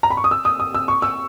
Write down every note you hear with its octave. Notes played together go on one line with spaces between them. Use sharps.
A#5
B5
C#6
D#6
E6
D#6
D#6
E6
C#6
E6